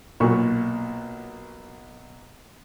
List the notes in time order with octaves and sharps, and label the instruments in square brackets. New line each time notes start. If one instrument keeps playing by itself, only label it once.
[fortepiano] B1 A#2 F#3 C#6